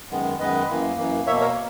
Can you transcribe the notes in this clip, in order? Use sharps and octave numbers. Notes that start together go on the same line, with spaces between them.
F#2 D#3 G#3 B3
F#2 D#3 G#3 B3 B4 D#5
F#2 E3 A#3
F#2 E3 A#3
B2 A#3 C#5 E5
A#4 C#5